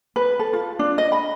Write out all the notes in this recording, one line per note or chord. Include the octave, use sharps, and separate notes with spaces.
B4
A4
F4
D4
D#5
B5